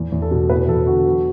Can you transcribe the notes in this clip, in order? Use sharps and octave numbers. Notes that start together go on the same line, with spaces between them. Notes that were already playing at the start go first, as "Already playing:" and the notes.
Already playing: E2
E2
A4
B2
E2 B4
E2 A4
D3 F#4
F#3